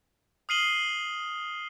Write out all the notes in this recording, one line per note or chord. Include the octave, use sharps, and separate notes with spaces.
D#6 F6 C7 D#7 F#7 G7